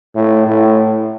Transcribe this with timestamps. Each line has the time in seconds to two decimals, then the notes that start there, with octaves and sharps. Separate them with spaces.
0.15 A2
0.46 A2